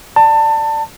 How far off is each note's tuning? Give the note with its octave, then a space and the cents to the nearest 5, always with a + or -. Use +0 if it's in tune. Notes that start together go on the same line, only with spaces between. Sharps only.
D5 +10 A5 +25